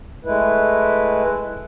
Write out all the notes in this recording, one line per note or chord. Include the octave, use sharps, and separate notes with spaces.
G#3 A3 E4 B4